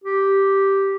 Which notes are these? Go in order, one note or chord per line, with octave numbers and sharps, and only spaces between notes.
G4